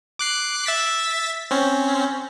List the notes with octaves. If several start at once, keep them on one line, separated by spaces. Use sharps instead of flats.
D6 F#6 C7
E5 A6 B6
C4 C#4